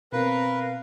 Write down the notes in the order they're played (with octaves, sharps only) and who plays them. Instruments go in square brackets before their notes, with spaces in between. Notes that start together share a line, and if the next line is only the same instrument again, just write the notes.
[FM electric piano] B2 C4 [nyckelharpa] A#4 [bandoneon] B4 [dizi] F5